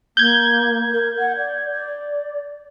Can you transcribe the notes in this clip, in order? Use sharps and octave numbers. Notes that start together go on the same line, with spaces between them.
A#3 G6 G#6
A#4
F#5
D5
D5